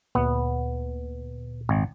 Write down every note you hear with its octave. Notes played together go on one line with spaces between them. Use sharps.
D2 A#2 B3
G#1